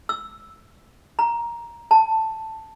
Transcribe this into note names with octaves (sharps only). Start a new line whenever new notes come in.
E6
A#5
A5